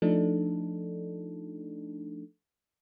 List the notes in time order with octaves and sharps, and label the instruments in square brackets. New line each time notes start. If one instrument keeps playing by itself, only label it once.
[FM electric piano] F3 A3 D4 D#4 A4